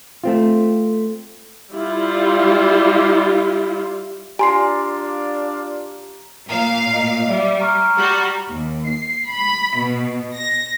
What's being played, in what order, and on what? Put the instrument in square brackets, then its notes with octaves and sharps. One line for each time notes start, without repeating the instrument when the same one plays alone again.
[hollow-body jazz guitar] A3 C4 F4
[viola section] G3 E4 F4
[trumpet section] D4 F4 D5 [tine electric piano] G4 [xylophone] G#5 C6 C7 [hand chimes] A#5
[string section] A#2 F5 [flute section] A#5
[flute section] D#5
[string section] G3 [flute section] D5 E5
[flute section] A#5 C#6 F6
[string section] G3 F#4
D#2
C7
B5
B2
A#6